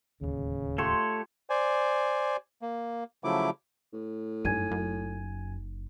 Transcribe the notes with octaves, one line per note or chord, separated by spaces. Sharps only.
D1 G1 D#2 C#3
A3 F4 G4 A4 C#5 C6
C5 D5 G#5
A#3
C#3 F3 F#3 A3 E4 D6
A2
F#1 G2 D#4 G#5 G#6 D#7
F#2